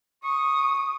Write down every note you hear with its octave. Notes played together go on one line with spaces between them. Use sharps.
C#6 D#6